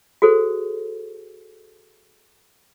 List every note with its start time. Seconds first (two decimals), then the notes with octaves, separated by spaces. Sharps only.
0.22 F#4 G#4 A4 C5